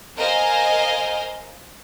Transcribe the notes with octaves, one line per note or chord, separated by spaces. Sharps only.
A#4 C5 D#5 F5 G#5